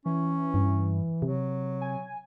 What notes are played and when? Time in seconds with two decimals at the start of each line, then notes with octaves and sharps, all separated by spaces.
0.06 E3 C#4
0.54 G2
1.22 C3 F#3
1.81 G#5